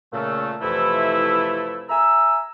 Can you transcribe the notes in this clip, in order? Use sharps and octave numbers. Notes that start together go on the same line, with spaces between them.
A#2 C#3 A3
F2 C3 E3 A3 E4
E5 G#5 A#5 E6